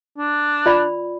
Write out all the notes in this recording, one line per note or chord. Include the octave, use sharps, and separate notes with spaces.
D4
F4 D5 B5